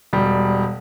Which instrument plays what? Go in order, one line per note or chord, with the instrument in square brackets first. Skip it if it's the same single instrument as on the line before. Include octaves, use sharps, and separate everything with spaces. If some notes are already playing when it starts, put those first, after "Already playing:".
[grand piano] E1 G3